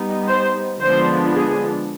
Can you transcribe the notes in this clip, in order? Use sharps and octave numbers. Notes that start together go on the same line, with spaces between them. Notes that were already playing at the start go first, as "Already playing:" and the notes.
Already playing: G3 B3 D#4
C5
D3 F3 G#3 B3 D4 C5
G#4